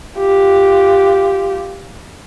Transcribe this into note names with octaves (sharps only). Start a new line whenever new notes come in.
F4 G4